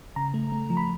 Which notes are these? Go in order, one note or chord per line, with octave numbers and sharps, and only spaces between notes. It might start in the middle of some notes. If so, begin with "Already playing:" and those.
C#3 A#5
A3
A3
F3
B5